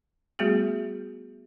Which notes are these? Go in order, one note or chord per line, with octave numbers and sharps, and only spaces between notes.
G3 A3 B3 F#4 G#4